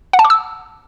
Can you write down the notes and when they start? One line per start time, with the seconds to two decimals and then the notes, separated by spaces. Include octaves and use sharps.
0.13 F#5
0.19 A5
0.25 D6
0.30 E6